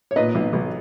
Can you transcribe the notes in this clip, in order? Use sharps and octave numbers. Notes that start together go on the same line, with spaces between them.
C#5
A#2 B4 D#5
B1
B1